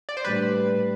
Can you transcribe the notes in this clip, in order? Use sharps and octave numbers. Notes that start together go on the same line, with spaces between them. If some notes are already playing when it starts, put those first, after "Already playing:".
D5
C5
A2 G3 D4 B4